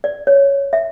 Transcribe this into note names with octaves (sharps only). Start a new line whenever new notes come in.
D5
C#5
E5